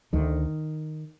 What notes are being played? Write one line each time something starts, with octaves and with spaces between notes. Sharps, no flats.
D2 D3 D#3